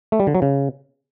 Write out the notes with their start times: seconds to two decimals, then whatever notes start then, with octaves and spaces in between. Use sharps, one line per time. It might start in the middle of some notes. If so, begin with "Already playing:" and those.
0.12 A3
0.20 G3
0.27 D3
0.35 F#3
0.42 C#3